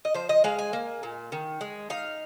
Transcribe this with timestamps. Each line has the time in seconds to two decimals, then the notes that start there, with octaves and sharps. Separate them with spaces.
0.05 D#5
0.14 F3 C5
0.29 D#5
0.44 G#3 F5
0.59 G#5
0.73 A#3
1.03 A#2
1.32 D#3
1.61 G#3
1.90 D#4 F5